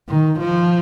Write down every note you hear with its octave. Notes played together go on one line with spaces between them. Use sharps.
D#3
F3